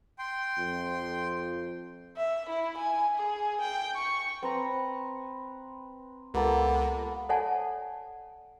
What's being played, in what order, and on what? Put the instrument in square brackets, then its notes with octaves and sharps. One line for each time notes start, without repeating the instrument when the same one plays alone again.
[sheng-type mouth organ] G5 C6
[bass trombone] F2
[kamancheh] E5
E4
G#5
G#4
G5
C#6
[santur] C4 B4 A#5
[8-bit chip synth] C#2 [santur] A#3 B3 A4
[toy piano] A4 C#5 D5 F#5 G#5 A5